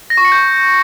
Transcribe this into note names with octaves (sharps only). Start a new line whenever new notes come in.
A#6
C#6
C#7
G6